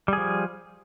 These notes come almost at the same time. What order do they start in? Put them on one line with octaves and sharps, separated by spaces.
G3 G#4 F3